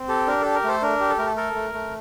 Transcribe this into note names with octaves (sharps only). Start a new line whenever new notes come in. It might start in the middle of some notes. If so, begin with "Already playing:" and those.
Already playing: C4
G4 A4
D4 A#4
G4 A4
A#4
A3 A4 C5
D4 A#4
G4
A4
A3 A#4
A4
A4 A#4
A3
A3